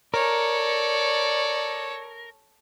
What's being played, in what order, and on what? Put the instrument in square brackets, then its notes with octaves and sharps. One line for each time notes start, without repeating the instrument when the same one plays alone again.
[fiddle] A4 C#5 [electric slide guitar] A#4 [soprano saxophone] D5